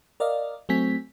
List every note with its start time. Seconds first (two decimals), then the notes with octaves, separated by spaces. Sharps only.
0.20 A#4 D5 D#5 F5
0.69 F#3 A3 C4 G#5 B6